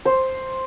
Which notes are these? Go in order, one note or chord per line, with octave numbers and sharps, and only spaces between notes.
C5